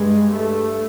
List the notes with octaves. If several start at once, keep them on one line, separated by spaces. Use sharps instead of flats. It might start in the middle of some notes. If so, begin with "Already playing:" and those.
Already playing: G2 G#3
A3